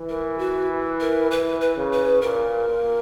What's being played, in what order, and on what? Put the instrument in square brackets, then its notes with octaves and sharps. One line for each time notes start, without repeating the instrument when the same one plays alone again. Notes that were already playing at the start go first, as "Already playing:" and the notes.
Already playing: [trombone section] E3
[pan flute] A#4
F#4
A#4
[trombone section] E3 [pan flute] B4
[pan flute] B4
[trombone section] C#3
[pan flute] B4
[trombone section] A#2 [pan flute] A#4
[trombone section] A#2